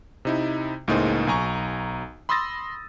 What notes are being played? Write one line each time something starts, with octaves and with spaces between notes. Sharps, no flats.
C3 D#4 E4
C#2 A2 A#3 D#4 G#4 C5
B1 G#5 A#5 C#6
B5 C6 D#6 E6 A6 A#6